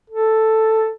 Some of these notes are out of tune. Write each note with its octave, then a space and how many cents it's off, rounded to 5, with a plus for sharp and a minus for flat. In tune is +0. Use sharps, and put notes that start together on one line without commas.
A4 +5